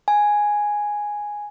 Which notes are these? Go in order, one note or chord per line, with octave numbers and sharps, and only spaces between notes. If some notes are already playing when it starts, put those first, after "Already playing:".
G#5